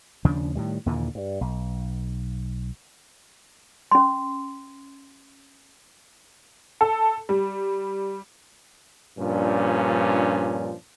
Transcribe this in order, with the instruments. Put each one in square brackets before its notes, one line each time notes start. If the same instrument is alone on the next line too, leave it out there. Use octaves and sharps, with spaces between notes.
[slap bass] D#2 C#3 F3 D4
A2 D#3 G3
D#2 A#2 D3 E3
G2
B1
[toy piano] C#4 C6
[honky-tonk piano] A4
G3
[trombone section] G2 A#2 F3 C#4 D4